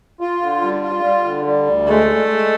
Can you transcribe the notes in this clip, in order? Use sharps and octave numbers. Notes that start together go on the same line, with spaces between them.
F4
D3
G3
F4
G3
D3
G3
D2
G#3 A3
G#3
G#3